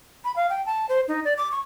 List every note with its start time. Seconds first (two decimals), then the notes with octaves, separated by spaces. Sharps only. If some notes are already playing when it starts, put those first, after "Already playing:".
0.25 B5
0.36 F5
0.50 G5
0.66 A5
0.89 C5
1.08 D#4
1.25 D5
1.38 D6
1.52 C#6